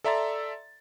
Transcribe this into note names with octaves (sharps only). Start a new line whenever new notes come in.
A4 D5 E5 A#5 C6 A6